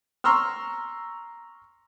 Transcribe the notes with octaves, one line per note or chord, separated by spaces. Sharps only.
A#5 C6 C#6 E6 F6